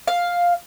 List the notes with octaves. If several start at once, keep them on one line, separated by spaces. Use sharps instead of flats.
F5